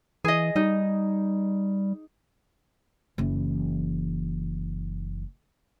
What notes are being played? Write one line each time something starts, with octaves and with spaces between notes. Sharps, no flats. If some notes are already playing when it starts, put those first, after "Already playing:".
E3 G#4 D#5
G3 D#4
F#1 E3